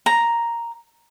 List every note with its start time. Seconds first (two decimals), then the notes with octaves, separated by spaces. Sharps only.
0.06 A#5